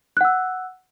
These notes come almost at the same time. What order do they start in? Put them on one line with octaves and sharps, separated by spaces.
F#6 F#5 E6